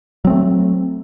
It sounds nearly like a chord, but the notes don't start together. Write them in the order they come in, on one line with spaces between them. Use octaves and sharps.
F#3 C4 A3